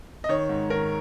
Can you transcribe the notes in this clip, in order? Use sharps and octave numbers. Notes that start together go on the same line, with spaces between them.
D#5
D#3 C#5
G#2
D#3 A#4